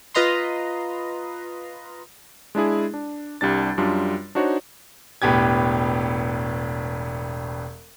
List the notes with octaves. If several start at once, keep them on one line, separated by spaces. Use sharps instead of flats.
F4 B4 D#5 A#5 C6
G#3 D4 E4 G#4
D4
C2 G3 D4 A6
F#2 G3 D4 F4
D4 D#4 F#4 C5 C#5
E1 A2 B3 G4 G#6